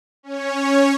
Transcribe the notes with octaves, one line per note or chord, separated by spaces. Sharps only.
C#4 C#5